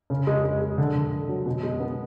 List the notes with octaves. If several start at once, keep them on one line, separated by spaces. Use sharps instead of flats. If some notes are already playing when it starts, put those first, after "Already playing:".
C#3
G#3
G#3
G#3
D3
D3
D3
F#3
B2
G#3
B3